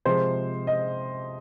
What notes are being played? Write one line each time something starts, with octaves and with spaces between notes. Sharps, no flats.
C3 F3 G#3 C5
D#5